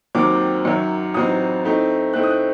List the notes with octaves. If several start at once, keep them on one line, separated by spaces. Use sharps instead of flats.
D#2 D#3 F#3 C4 D6
F#2 D#3 F#3
A1 A2 F#3 C4 D#4 D#6
A2 A3 C4 D#4
A2 A3 C4 D#4 F#6
D#6
F#6